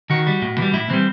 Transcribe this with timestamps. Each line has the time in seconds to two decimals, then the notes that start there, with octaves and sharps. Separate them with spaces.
0.10 D#3 F#4
0.27 G3
0.42 A2
0.58 E3 G3
0.73 A2 E4
0.90 E3 G3 C4